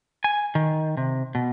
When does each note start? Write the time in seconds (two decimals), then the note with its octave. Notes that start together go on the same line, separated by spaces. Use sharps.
0.24 G#5
0.55 D#3
0.97 C3
1.35 B2